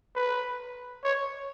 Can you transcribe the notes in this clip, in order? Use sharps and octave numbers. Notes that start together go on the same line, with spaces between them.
B4
C#5